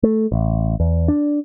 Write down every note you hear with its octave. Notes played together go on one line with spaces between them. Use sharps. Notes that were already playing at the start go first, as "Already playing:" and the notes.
A3
A1
E2
D4